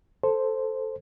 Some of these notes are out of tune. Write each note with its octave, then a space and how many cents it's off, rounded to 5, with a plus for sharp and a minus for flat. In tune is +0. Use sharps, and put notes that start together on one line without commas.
A4 +0 C5 +0